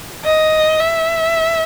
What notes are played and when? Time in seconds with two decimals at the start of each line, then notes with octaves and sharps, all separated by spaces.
0.25 D#5
0.81 E5